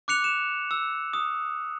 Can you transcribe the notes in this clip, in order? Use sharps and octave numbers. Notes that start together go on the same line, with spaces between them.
D6 F#6 C#7 F7
E7
E6
D#6